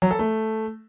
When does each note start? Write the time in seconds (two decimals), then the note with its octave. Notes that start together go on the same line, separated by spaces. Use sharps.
0.02 F#3
0.11 A4
0.19 A3